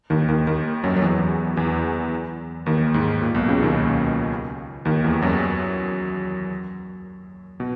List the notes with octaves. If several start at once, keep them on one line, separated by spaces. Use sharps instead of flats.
D#2 D#3
D#2 D#3
D#2 D#3
F#2 F#3
F#3
E2 E3
E2 E3
D#2 D#3
G#2
A#2
B1 B2
C#2 C#3
D#2 D#3
D#2 D#3
E2 E3
F#2 F#3
B2